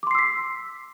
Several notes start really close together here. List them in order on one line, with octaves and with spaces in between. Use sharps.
D6 C6 C7 E6 B6